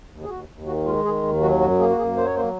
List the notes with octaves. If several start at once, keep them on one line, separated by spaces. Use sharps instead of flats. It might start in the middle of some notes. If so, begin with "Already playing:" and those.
D#2
G#4
D#2 F#4
D#2
D#3 F#4
G#3 F4
D#3 G#4
D#2
F#3 F#4
F#2 F#4
A#3 G#4
F#4
F#2 G#4
F#3 C5
C#5
A#3 C5